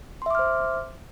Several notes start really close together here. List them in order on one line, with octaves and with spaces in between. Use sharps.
C6 E5 D6 F6 C5